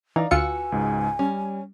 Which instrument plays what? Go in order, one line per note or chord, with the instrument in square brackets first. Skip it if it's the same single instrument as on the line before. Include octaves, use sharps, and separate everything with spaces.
[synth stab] E3 [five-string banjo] D#4 [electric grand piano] D5 F5 A#5
[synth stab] D2 F4 C#7 [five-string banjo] F#4 B4 [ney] G#5 [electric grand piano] E6
[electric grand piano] C#2 G#2
[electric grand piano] G3 [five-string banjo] C#4